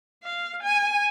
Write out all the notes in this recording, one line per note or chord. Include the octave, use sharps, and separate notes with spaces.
F5
G#5